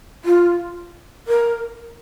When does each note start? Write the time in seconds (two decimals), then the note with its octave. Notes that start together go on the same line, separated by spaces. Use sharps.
0.25 F4
1.28 A#4